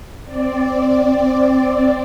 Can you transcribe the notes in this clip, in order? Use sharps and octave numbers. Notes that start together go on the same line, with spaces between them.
C4 D5